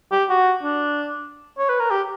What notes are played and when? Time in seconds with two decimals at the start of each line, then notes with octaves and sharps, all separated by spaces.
0.12 G4
0.29 F#4
0.63 D4
1.58 C#5
1.69 B4
1.79 A#4
1.91 G4